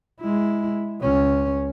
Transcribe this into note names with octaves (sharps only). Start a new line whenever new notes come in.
G#3 E4
C#2 C#4